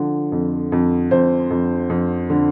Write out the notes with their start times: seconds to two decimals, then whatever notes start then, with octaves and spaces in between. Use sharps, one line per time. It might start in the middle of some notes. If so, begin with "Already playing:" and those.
Already playing: D3 F3
0.32 F2
0.72 F2
1.11 F2 C5
1.51 F2
1.90 F2
2.30 D3